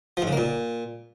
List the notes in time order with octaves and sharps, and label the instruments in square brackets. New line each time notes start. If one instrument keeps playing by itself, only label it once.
[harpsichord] F3
G#2
C#3
A#3
A#2